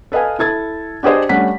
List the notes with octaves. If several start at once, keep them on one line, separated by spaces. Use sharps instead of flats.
A4 B4 D#5 F5 G#5
E4 A4 G#6 A6
D4 G4 G#4 C5 D#5
G3 A3 C#4 D4 F#5 B6